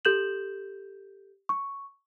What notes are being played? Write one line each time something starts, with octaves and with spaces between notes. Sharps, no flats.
G4 A4 G6 E7 F#7
C#6